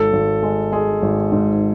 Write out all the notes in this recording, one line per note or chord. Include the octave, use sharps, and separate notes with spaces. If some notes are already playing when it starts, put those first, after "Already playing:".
Already playing: G#1 A4
G#1
G#3
G#3 G#4
G#1
G#2